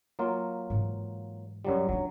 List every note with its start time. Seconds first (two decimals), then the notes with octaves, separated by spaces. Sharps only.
0.19 F#3 A#3 F4
0.70 G#2 E3
1.65 F#2 F#3 G3
1.89 G2 F#3 D4